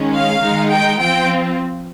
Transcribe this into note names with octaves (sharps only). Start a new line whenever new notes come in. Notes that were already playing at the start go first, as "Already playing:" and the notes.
Already playing: D#3 G#3 C#4
F5
D#3 G#3 D#4
G5
F3 C4 F4 G5